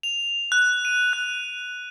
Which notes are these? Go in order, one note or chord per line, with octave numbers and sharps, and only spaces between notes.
F7
F#6
D#7
F#6